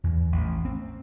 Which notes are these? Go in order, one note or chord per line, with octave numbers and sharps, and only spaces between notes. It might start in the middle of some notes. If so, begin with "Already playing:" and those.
E2
A1
C4